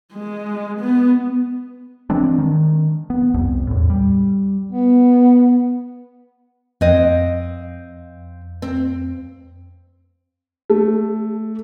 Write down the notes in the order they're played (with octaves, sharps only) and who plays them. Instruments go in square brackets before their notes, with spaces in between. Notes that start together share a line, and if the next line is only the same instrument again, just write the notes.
[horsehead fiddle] G#3
B3
[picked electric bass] E3 G#3 C4 D4
D#3
B3
C2 F2
E2 A2
G3
[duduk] B3
[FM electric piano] F2 [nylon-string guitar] C4 D#5
[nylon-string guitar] C4
[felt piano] A3